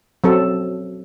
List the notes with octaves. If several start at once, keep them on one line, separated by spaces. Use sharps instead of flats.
F#3 C4 A4